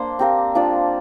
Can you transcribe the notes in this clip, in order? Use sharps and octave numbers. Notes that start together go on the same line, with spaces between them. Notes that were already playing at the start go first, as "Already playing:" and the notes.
Already playing: A#3 D4 C5
C4 G4 A#4 F5
F3 D4 F4 D5